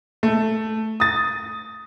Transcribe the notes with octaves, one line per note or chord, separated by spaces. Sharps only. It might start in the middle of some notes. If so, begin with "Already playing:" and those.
A3
D#6 A6